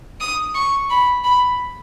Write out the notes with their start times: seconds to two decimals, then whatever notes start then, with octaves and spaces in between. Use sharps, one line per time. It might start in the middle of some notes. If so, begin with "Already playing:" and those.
0.20 D#6
0.55 C#6
0.90 B5
1.24 B5